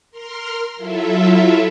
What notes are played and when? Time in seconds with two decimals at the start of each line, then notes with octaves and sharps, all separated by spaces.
0.11 A#4 C6 F6
0.76 F#3 E4 F4 A4 E5